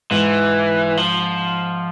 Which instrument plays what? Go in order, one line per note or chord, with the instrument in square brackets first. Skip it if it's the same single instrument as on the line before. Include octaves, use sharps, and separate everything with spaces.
[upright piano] G#2 [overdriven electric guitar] E3
[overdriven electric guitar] F3